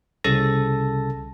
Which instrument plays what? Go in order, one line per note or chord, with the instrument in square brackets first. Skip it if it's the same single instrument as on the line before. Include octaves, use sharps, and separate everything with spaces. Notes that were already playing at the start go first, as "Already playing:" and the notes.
[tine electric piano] C2 C#3 A4 A5 A#6